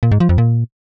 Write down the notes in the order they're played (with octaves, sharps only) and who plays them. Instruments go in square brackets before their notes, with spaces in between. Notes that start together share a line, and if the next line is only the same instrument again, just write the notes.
[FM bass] A#2
G#2
F3
F2
A#2